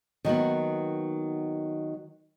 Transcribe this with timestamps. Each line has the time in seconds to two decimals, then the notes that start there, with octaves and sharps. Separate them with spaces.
0.25 D#3 F#3 A#3 B3